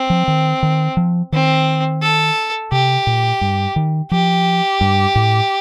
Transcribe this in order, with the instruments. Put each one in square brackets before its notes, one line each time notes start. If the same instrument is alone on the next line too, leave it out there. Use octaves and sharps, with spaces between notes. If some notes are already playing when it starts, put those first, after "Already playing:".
Already playing: [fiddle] C4
[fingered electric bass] F3
D#3
D#3
F3
[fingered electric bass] D#3 [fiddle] C4
[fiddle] A4
[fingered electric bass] C3 [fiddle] G4
[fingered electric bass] A#2
G2
D#3
[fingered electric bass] F3 [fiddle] G4
[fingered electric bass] G2
A2